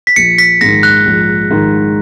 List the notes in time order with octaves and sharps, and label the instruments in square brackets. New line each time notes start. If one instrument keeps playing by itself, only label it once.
[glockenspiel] B6
[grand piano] A#1 [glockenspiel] C#7
[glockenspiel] B6
[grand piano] G#2 D#3 [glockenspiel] A#6
[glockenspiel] F#6
[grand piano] A#1
G#2 D#3